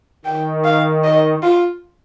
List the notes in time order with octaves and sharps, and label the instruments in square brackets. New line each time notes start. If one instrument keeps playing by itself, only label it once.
[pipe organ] D#3 [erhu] G5
[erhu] F5
D#5
F4